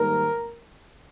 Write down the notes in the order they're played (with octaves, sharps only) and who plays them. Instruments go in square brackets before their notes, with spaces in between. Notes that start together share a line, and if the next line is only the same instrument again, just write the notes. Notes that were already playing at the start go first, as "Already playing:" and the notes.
Already playing: [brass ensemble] G#2 D#3 G3 A#3 A#4